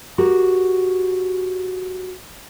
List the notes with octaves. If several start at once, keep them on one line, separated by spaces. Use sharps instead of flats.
F#4 G4 A#4